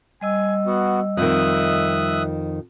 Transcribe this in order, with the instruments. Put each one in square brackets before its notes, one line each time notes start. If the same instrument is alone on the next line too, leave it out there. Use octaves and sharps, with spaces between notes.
[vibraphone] G3 D#5 E6 [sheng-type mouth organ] G#5
[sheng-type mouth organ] B3 F#4
[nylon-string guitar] F2 D#3 [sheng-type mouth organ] E5 D#6 F#6